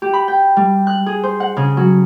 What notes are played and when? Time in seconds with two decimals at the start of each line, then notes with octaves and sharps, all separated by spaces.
0.02 G4
0.13 B5
0.28 G5
0.57 G3
0.87 F#6
1.06 G#4
1.23 C5
1.40 F#5
1.57 C#3
1.77 F#3